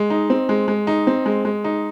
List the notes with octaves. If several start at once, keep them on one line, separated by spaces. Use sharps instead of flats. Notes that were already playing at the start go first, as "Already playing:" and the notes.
Already playing: G#3
D#4
C4
G#3
G#3
D#4
C4
G#3
G#3
D#4